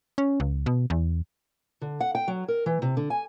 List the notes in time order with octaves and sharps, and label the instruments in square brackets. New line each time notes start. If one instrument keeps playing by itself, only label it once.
[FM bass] C#4
C#2
B2
E2
[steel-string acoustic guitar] D3
F#5
G5
F#3
A#4
E3
C3
D3
G#5